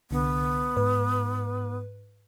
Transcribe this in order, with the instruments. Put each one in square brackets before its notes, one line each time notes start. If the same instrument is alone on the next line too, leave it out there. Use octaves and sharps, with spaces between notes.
[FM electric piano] C2 D3 [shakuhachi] B3
[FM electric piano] G#2 B4